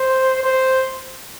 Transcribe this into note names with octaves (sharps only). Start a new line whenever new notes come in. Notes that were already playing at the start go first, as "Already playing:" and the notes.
Already playing: C5
C5